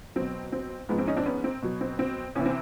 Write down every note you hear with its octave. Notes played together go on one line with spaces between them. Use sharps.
B2 F#3 C4
C4
G#2 F3 G#3 B3
C4
C#4 D#4
C4 D4
B3 C#4
C4
B2 F#3
C4
C4
E2 C3 E3 C#4
C4